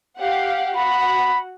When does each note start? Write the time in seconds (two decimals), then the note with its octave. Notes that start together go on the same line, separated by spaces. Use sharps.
0.19 G4 F5 F#5
0.76 F#4 F#5 B5